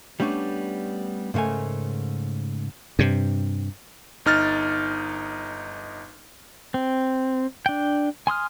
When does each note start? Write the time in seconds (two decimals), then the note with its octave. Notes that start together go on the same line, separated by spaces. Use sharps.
0.20 G3 A3 B3 C#4 D4
1.34 G#2 C#3 A3 A#4 G#5
2.99 G2 C3
4.26 G1 D#4 F6 A6
6.74 C4
7.66 D4 G5
8.27 G#5 C6 D#6 F6